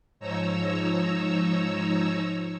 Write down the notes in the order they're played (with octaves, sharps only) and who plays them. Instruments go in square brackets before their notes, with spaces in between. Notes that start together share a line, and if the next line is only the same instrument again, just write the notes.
[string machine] G#2 F3 D#4 C#5 A#5 E6